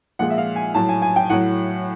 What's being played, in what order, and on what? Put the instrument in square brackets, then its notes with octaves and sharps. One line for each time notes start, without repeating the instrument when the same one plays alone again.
[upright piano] A#2 F3 G#3 F#5
E5
F5
G#5
A2 F#3 A5
G#5
G#5
G5
A2 F#3 F#5